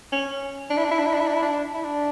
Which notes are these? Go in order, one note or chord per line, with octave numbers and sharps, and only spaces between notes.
C#4
D4
E4
D4
E4
D4
E4
D4
E4
D4
E4
D4
E4
D4